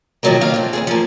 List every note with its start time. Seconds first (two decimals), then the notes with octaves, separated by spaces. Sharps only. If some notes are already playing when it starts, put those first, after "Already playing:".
0.23 D#3 F3 F#3 G#3 A#3
0.41 D#3 A#3 D4 F5
0.54 A3 C4
0.73 D#2 C3 G#4
0.87 F3 A#3